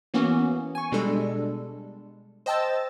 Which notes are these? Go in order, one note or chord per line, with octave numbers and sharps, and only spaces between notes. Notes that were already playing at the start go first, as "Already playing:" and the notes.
E3 A#3 B3 C#4 F#4
G#5 C#6
B2 G3 G#3 D4 A4
C5 D#5 G5 A5 E6 A6